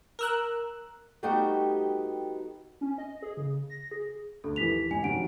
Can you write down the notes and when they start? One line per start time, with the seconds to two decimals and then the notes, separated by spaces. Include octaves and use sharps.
0.19 A#4 E6 F#6
1.23 G3 A3 B3 D#4 F#4 G4
2.81 C#4
2.98 D#5
3.22 G#4
3.37 C#3
3.70 A#6
3.91 G#4
4.44 D2 A4
4.56 D#2 E3 B6 F7
4.91 G#1 G#5
5.03 F1 D#3 F#4 F#5 D7